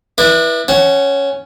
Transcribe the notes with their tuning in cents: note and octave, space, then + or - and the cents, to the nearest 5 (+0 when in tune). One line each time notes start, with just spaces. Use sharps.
E4 +0 B4 -25 D5 +35
C#4 +0 F#5 +25 A5 -35